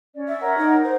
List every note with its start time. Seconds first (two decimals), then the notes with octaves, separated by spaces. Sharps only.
0.16 C#4 D5
0.28 E5
0.40 A#4 C#5 F#5
0.58 D#4
0.84 C5 F#5